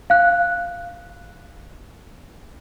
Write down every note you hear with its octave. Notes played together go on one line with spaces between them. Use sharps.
F5 F#6